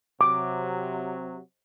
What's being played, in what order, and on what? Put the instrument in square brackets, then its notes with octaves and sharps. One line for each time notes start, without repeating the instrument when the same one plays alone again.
[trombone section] C3 F#3 [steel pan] D6